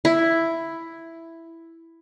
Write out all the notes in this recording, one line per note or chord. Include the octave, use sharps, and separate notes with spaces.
E4